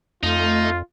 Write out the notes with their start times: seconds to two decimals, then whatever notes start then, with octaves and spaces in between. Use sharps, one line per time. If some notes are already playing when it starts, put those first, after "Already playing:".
0.23 F2 A3 D#4 F4